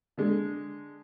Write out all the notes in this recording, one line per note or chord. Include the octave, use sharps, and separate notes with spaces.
D3 G#3